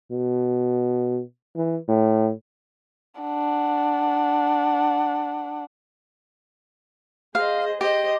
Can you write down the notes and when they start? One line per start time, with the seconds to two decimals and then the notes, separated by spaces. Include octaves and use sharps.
0.11 B2
1.56 E3
1.88 A2
3.21 D4 F#5
7.35 G#4 C5 D#5 F5
7.81 G4 C5 D#5